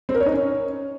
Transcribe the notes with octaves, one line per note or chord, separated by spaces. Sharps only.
C4
A#4
C#5
D#4
C#4